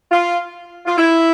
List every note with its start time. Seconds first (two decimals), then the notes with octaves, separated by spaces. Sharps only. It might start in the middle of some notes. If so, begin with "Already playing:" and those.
0.11 F4
0.86 F4
0.97 E4